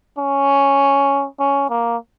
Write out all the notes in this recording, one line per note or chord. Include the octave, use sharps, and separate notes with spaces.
C#4
C#4
A#3